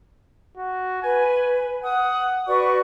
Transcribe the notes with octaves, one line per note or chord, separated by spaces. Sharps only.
F#4
B4 G#5
F#5 D#6
F#4 B4 D5 C#6